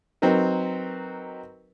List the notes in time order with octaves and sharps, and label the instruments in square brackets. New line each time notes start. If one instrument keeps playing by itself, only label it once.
[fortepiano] F#3 C4 D#4 A#4 B4